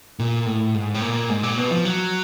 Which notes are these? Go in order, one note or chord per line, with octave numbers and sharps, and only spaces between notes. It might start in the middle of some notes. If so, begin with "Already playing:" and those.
A#2
A2
G#2
A2
A#2
G#2
A#2
B2
F3
F#3